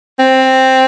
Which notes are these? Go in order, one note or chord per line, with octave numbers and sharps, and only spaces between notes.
C4